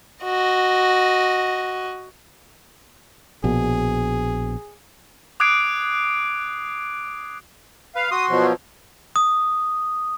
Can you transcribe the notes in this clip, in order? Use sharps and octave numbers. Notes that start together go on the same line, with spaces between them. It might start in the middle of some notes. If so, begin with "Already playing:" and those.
F#4 D#5
A#1 B2 G#4
D6 D#6 F#6 G#6 C7 D7
B4 F5
F#4 C6 D#6
B2 F3 F#3
D#6